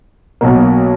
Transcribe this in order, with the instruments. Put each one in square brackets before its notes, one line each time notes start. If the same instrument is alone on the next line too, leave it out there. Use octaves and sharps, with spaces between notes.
[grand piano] B1 B2 A#3